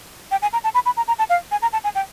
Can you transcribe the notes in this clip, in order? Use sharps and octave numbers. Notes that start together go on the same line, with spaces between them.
G5
G#5
A#5
A5
B5
B5
A#5
A#5
A5
F5
G#5
A#5
A5
G#5
G5